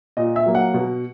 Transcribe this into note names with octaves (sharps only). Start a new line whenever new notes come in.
A#2 D#5
E5
F#3 A#3
F#5
B2